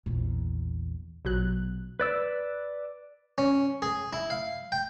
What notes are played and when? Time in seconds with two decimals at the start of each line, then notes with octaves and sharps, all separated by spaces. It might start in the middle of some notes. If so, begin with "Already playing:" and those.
0.06 A#1 E2
1.25 A#1 B2 F#3 F#6
2.00 B4 D5 E6
3.38 C#4
3.82 G#4
4.13 E4
4.30 F5
4.72 G5